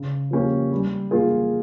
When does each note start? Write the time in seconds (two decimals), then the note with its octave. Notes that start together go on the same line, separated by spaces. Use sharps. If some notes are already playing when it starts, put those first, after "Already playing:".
Already playing: C#3
0.31 F3 A#3 C#4 G4
0.72 G3
1.11 A#3 F4 G#4